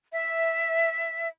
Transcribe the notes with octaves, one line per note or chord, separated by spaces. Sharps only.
E5